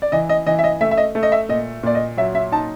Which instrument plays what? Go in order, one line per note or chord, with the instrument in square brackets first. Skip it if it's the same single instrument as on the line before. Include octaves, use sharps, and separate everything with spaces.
[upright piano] D5
E3 D#5
D#5
E3 D#5
E5
D#5
A3 E5
E5
D#5
A3
D#5
E5
A#2 D#5
A#2 D5
D#5
F#3 E5
E5
D#4 A5